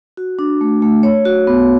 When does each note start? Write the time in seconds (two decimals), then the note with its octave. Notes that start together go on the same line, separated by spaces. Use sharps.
0.17 F#4
0.39 D4
0.61 A3
0.82 A3
1.03 C#5
1.25 F#4
1.47 B3